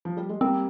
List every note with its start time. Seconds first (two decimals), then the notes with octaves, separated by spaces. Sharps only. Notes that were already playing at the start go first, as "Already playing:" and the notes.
0.05 F3
0.17 G3
0.29 G#3
0.41 G3 A#3 C4